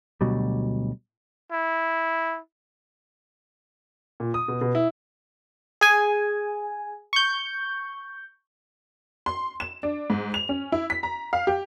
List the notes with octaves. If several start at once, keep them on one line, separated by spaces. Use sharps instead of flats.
D2 B2 F#3 G3
E4
A#2
D#6
B2
B2
E4
G#4 G#5
C#6 G6
C6
E7
D4
G#2
F7
C#4
E4
B6
A#5
F5
G4